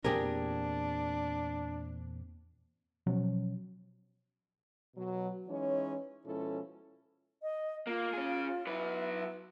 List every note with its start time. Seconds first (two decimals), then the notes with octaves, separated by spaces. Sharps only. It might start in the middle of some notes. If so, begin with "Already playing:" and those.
0.04 E2 A#2 C4 D4 G4 G#4 A#4
3.07 B2 F3 F#3 C#4
4.96 B2 F#3
5.48 E3 G#3 C#4 D#4 C#5
6.25 B2 F3 G#3 C#4 E4 A4
7.42 D#5
7.87 A#3 F4
8.13 C#4 G#4
8.67 F#3 E4 B4